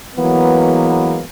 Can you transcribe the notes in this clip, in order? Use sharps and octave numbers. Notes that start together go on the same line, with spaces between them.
E3 F#3 G#3 A#3 B3